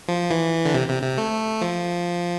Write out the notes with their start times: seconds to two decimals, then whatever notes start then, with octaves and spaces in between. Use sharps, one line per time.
0.08 F3
0.31 E3
0.65 D3
0.74 C3
0.88 C3
1.03 C3
1.18 A3
1.61 F3